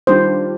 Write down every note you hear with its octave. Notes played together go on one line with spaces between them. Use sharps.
D#3 G3 D4 F4 C5